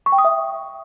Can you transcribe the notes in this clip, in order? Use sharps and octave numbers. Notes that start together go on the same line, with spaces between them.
C#6
G5
D#6
E5